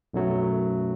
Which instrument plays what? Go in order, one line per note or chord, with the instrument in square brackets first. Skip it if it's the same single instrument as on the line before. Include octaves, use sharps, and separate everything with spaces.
[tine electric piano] B1 F#2 F#3 A3